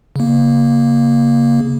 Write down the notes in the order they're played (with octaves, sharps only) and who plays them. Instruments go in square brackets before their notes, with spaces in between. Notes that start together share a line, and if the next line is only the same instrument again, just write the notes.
[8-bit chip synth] C#3 A#3